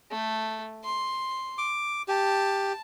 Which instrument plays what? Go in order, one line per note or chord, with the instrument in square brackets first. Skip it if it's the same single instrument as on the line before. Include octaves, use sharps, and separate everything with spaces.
[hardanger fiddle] A3
C6
[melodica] D6
[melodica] G4 [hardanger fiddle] A5